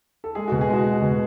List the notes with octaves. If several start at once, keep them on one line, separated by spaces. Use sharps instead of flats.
A4
G#3 G#4
F#4
B2
G#4
G#3 F#4
G#3
B2